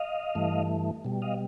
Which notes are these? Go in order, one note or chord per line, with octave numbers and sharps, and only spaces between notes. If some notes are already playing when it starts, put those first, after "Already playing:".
Already playing: D#5 F5
G2 E3 A3
B2 G3
D#5 F5